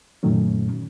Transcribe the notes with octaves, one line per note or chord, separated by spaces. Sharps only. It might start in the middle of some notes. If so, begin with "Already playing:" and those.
F#2 A#2 D#3 F#3 A3 C#4